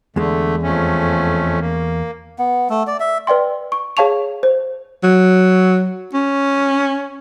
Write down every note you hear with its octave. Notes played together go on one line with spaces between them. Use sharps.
E2 D3 G#3 A3
F2 A3 C#4
A#3
B3
A3
D5
E5
B4 D5 G5 C6
C#6
G#4 C#5 F5 A5 C#6 F7
C5
F#3
C#4